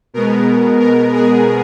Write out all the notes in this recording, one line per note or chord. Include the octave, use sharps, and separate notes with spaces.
B2 G#3 B3 A#4
A#4
G#4